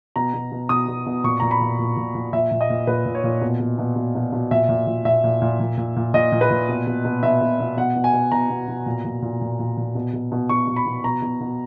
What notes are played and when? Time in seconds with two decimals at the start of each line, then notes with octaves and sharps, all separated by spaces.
0.16 B2 A#5
0.34 B2
0.52 B2
0.69 B2 D#6
0.88 B2
1.06 B2
1.24 A#2 C#6
1.40 A#2 A#5
1.51 B5
1.61 A#2
1.79 A#2
1.97 A#2
2.15 A#2
2.33 A#2 E5
2.51 A#2
2.61 D#5
2.70 A#2
2.87 A#2 B4
3.06 A#2
3.15 C#5
3.24 A#2
3.42 B2
3.60 B2
3.78 B2
3.96 B2
4.15 B2
4.32 B2
4.51 A#2 E5
4.69 A#2
4.87 A#2
5.05 A#2 E5
5.24 A#2
5.42 A#2
5.60 A#2
5.78 A#2
5.96 A#2
6.14 A#2 D#5
6.32 A#2
6.41 B4
6.51 A#2
6.69 B2
6.87 B2
7.05 B2
7.23 B2 E5
7.41 B2
7.60 B2
7.77 B2 F#5
7.95 B2
8.04 G#5
8.13 B2
8.32 B2 A#5
8.50 B2
8.68 B2
8.86 A#2
9.05 A#2
9.22 A#2
9.41 A#2
9.59 A#2
9.77 A#2
9.95 B2
10.13 B2
10.32 B2
10.49 B2 C#6
10.67 B2
10.76 B5
10.86 B2
11.04 B2 A#5
11.22 B2
11.40 B2